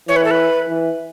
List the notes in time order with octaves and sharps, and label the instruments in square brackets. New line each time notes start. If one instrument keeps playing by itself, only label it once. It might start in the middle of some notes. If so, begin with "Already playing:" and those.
[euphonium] E3 [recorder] C#5
[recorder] B4
A4
B4
[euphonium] E3